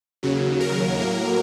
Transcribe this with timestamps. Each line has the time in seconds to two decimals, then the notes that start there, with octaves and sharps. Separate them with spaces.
0.23 D#2 C#3 F#3
0.61 A#4
0.98 A2 F#3 A#3